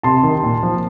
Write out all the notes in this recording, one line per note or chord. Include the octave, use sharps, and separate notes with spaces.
C3 A5 C6
D#3
A#2
F3